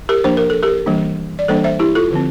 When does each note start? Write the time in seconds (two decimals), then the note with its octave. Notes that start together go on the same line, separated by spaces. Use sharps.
0.09 G4 A#4
0.24 F3 A#3 D4 C5
0.37 A#4
0.50 A4
0.63 G4 A#4
0.86 E3 G3 A#3 D4
1.39 D5
1.48 E3 G3 A#3 D4 A4 C5
1.64 C5 E5
1.79 E4 G4
1.95 F4 A4
2.11 D3 F3 C4